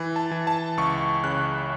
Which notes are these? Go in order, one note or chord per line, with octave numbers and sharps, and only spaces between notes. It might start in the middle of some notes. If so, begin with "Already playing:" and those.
Already playing: E3
A5
E3
A5
C#2 C#6
C#3 F#6